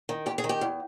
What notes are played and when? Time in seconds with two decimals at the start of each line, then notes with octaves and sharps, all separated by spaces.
0.09 D#3
0.26 E2 G4
0.38 G#4
0.44 D#3
0.49 G4
0.61 E2